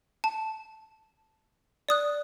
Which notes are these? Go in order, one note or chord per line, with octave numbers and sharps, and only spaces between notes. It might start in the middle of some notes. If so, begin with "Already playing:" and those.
A5
D5 D#6 F#6